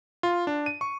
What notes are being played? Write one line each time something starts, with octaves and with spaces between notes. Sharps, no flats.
F4
D4
D#7
C#6